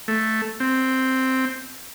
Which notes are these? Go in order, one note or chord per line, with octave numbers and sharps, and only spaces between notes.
A3
C4